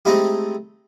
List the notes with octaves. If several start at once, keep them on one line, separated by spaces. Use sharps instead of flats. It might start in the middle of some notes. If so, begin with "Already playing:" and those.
G#3 A3 C4 D#4 E4 G4